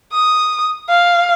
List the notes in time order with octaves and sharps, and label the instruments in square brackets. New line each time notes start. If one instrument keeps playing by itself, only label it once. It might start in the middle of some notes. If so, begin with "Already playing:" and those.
[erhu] D#6
F5